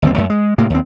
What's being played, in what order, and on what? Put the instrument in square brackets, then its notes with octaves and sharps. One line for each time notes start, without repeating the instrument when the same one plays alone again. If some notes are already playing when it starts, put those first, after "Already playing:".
[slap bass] G1 D#2 D3 C4
F#2 A3
G#3
A2 C3 A#3
D#2 C4